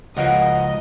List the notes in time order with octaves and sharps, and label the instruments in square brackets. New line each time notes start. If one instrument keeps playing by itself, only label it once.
[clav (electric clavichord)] C#2 F3 [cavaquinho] F#4 A#4 F#5 [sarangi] D#5